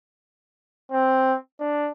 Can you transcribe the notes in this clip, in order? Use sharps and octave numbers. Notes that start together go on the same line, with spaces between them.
C4
D4